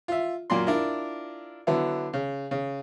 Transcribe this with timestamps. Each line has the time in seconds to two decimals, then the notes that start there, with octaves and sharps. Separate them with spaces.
0.08 F4 E5
0.50 F#2 A#2 A#3 D5 C6
0.67 D4 E4 F4 A#4
1.67 D3 F#3 B3 E4
2.13 C#3
2.51 C#3